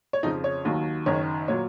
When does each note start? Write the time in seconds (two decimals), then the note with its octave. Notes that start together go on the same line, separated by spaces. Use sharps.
0.13 C#5
0.23 F2 C#3 F3 D#4 D#5
0.44 C#5
0.65 D#2 D#3 F#3
1.06 F#1 F#2 D#3 C#5
1.48 A#2 F#3 C#5